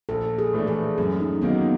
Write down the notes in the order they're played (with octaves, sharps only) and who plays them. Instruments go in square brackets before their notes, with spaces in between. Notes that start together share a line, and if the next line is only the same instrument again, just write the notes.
[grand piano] A#1 [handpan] A4
[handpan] G#4
[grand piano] A2 E3 A3 D4
[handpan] G#4
[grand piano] F#2 [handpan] G#4
[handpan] D#4
[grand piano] D#3 F#3 A#3 D#4 [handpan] B3